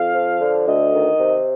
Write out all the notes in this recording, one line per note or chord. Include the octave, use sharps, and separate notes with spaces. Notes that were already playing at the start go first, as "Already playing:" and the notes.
Already playing: F2 F5
F3
D3
D2 D#5
D#3
C3